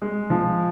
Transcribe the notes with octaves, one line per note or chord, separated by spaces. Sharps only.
G#3
F3